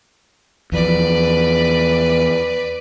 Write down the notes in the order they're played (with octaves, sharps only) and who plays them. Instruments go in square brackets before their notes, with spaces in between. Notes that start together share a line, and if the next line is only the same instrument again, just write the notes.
[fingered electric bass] E2 F3 [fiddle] B4 D5